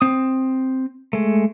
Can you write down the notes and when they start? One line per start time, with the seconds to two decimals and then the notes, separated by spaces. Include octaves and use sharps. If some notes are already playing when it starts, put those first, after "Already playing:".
0.01 C4 D#6
1.13 G#3 A3